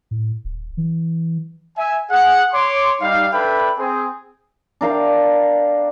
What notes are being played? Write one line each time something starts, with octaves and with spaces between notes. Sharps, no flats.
A2
D#1
E3
E5 G#5
G#4 F#5
C#5 C6 D6
G3 D#4 F5
D4 A4 B4 E5 G5 B5
C4 G#4
D4 A#4 F5 G5